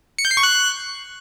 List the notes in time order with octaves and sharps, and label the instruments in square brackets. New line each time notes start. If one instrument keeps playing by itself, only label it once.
[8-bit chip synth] C#7
G6
C7
C#6
F#6